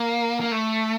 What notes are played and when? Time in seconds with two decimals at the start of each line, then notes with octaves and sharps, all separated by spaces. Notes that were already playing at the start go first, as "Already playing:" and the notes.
Already playing: A#3
0.41 A#3
0.52 A3